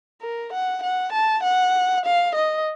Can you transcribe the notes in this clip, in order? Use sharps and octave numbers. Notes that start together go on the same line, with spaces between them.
A#4
F#5
F#5
A5
F#5
F5
D#5